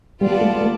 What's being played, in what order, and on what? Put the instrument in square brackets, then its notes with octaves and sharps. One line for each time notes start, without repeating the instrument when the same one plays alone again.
[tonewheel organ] G3 [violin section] B3 F4 B4 D5 A5
[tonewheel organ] A3
A3